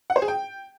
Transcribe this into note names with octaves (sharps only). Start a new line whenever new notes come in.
F#5
C5
G#4
G5